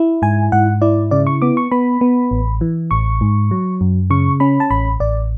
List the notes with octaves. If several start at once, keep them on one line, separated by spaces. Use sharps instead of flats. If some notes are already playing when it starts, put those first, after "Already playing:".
Already playing: E4
G#2 G#5
G#2 F#5
E4 D5
C#3 D5
C#6
B3 D6
C#6
B3 B5
B3
A1
E3
A1 C#6
G#2
F#3
F#2
C#3 C#6
C#4 B5
A5
A1 B5
A1 D5